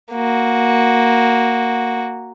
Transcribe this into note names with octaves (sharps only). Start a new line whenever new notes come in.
A#3 F#4